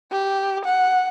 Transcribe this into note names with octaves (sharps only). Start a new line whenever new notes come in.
G4
F#5